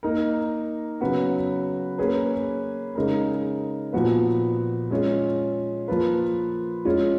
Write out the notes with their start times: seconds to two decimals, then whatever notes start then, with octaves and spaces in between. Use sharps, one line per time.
0.03 A#3 D#4 A#4
1.01 C#3 F#3 B3 F#4 B4
1.98 A#3 C#4 G#4 B4
2.95 C#3 G#3 D#4 A#4
3.93 A#2 F3 B3 F#4 B4
4.91 G#3 C#4 F4 G#4
5.88 F3 A#3 F4 B4
6.85 G#3 C#4 F4